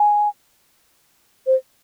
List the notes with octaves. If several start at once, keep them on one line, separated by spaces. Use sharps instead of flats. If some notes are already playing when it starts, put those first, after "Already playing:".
Already playing: G#5
C5